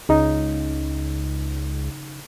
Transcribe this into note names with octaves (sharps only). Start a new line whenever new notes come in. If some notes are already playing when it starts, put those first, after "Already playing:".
C#2 C#3 D#4